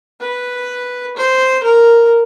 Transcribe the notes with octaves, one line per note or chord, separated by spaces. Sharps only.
B4
C5
A#4